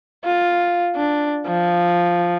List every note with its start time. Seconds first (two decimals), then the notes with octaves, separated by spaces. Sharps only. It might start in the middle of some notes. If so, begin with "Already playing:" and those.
0.25 F4
0.95 D4
1.47 F3